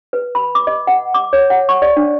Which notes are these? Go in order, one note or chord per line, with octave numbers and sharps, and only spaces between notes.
B4
B5
D6
D#5
F#5
D6
C#5
F#5
C#6
D5
D4